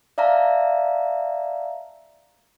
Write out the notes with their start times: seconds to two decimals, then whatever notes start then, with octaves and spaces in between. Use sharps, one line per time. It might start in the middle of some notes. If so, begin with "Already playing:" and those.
0.18 D5 E5 F5 A5 A#5